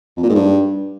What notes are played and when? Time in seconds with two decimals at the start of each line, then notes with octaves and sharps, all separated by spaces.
0.17 F2
0.23 A#2
0.29 G#2
0.35 G2